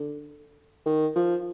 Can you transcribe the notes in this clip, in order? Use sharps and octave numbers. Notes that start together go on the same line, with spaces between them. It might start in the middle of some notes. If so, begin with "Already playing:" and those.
Already playing: D3
D#3
F3